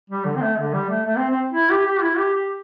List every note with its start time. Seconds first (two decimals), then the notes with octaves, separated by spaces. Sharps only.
0.10 G3
0.25 D3
0.36 C4
0.42 A3
0.58 D3
0.74 G3
0.90 A3
1.05 A3
1.18 C4
1.30 C4
1.53 E4
1.70 G4
1.85 G4
2.02 E4
2.18 G4
2.33 G4